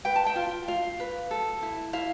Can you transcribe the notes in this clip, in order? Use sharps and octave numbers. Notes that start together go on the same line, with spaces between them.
B4 G5
A5
G5
F4
F4 F5
B4
A4
E4
E4 F5